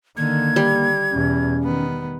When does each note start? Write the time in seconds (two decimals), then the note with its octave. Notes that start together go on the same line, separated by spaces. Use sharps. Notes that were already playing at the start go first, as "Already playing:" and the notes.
0.17 D3 D#3 A#3 G#6
0.56 G3
1.11 E2 B2 C#4
1.64 D#3 B3